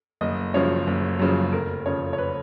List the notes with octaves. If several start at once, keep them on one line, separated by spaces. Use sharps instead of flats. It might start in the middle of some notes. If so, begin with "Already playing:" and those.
F#1 D#5
F#2 C#3 F3 C#5
F#1
F#2 C#3 F3
F1 A#4
F2 C#3 F3 C#5
C#5
B4